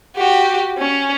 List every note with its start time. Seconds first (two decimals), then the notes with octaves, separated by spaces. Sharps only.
0.16 F#4 G4
0.78 C#4